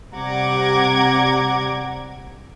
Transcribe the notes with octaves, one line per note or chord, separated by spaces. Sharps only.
C3 G3 F#5 A#5 D6 G#6